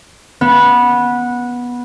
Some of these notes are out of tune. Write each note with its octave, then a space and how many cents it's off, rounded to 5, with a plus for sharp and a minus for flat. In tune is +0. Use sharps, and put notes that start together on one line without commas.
B3 -15